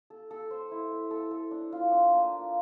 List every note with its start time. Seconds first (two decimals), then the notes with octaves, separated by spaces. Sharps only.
0.10 A4
0.31 A4
0.51 C5
0.71 E4
0.92 E5
1.11 A4
1.31 A4
1.51 D4
1.72 F4
1.91 D4
2.12 A#3
2.32 F4